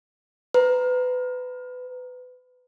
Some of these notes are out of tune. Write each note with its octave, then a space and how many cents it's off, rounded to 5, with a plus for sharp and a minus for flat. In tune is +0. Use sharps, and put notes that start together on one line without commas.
B4 +25 A#5 +0